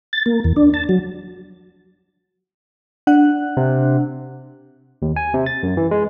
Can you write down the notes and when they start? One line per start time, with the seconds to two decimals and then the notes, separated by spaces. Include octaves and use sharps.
0.13 A6
0.26 A#3
0.44 E2
0.56 D4
0.74 A5
0.89 F#3
3.07 D4 F#5 F#6
3.57 C3
5.02 D#2
5.16 G#5
5.34 C3
5.46 A6
5.63 F#2
5.77 E3
5.91 G#3